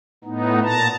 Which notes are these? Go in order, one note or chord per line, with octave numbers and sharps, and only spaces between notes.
A2 B3 D#4
A#2 A5 A#5